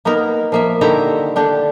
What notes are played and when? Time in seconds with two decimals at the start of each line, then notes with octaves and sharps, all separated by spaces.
0.05 A#3 B3 D#4 A#4
0.52 F3 A#3 E5
0.81 D3 D#3 E4 G4 E5 A#5
1.36 D3 D4 G4